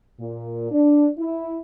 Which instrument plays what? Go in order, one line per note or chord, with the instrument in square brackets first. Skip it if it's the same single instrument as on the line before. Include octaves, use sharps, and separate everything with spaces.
[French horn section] A#2
D4
E4